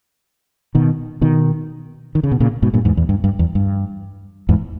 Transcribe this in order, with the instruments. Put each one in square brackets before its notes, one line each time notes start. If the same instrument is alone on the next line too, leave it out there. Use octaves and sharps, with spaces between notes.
[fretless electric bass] B2 D#3
B2 D#3
D#3
C#3
B2
A#2 C#3
G#2 B2
G2 A#2
E2 G#2
E2
G2
G2
E2
G2
E2 G#2